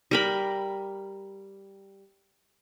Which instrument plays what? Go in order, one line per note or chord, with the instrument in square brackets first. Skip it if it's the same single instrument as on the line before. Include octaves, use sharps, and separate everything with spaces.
[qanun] G3 A#4 B5